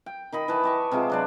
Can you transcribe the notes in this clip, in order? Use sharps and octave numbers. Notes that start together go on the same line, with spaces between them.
G5
D#3 D#5 B5
E3 B4 A5
G4 D#5 C#6
C3 G#3 F4 D6
F#3 D4 D5